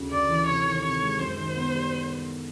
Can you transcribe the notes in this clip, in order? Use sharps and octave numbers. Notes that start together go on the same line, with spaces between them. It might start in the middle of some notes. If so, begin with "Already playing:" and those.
Already playing: D2 C#3
D2 D5
E3
C3 C#5
D#3
C3 C#5
G#3
F#2 C5
D#3
B3
G3